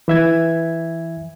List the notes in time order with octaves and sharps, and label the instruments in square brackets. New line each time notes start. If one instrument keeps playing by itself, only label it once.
[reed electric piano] E3 E5 G#6